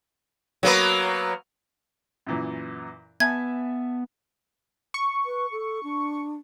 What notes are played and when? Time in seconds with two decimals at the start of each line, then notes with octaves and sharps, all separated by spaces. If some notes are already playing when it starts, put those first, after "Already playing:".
0.63 F#3 A#3 B3
2.27 F#2 A#2 E3
3.20 B3 E5 G#5 A5 G#6
4.94 C#6
5.26 B4
5.52 A4
5.84 D4